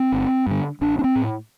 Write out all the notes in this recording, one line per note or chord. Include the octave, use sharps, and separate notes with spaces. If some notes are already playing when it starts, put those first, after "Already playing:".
Already playing: C4
G1
G2 D3
A1 D4
D4
C4
A2